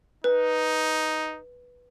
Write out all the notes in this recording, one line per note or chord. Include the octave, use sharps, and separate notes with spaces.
D#4 B4